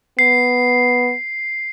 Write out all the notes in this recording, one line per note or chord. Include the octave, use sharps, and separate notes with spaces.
B3 C7